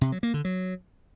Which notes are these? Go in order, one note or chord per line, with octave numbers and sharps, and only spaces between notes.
C3
F#3
A#3
D3
F#3